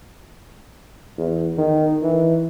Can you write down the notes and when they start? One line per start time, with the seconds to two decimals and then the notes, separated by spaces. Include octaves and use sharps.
1.17 E2
1.58 D#3
2.02 E3